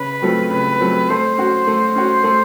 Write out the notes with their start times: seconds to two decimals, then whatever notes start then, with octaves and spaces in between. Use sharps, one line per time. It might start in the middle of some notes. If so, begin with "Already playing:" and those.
Already playing: C#3 B4
0.22 F#3 A3 C4 F4
0.50 C#3 B4
0.80 F#3 A3 C4 F4
1.09 A3 C5
1.38 C#4 F#4
1.67 A3
1.95 C#4 F#4
2.24 A3